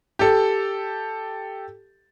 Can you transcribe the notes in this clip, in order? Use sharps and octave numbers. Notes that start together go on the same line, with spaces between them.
G4 A4